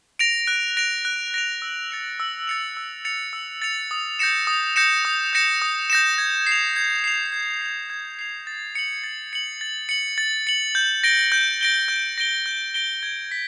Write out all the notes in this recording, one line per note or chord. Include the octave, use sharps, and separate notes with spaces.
A#6 D7 F7
F#6
A#6 D7 F7
F#6
A#6 D7 F7
E6
A6 C#7 F7
E6
A6 C#7 F7
E6
A6 C#7 F7
E6
A6 C#7 F7
D#6
G6 A#6 C#7 E7
D#6
G6 A#6 C#7 E7
D#6
G6 A#6 C#7 E7
D#6
G6 A#6 C#7 E7
G#6
C7
F7
G#6
C7 F7
G#6
C7 F7
G#6
C7 F7
A6
C#7 F#7
A6
C#7 F#7
A6
C#7 F#7
A6
C#7 F#7
G6
A#6 D7 G7
G6
A#6 D7 G7
G6
A#6 D7 G7
G6
A#6 D7 G7
G#6
B6